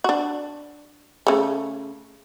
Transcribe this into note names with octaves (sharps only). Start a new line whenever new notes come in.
D4 F#4
C#3 A3